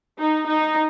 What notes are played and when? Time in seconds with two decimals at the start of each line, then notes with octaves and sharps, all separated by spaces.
0.19 D#4
0.46 D#4